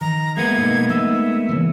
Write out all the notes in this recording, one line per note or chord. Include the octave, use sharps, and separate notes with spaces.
D#3 A#5
G#3 A#3 B3 E5 A5 G#6
B2 A3 D#4
A3 D#4 E5
C#3 E3